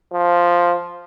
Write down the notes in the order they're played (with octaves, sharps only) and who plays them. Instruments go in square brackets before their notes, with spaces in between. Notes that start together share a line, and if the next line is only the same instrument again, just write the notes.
[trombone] F3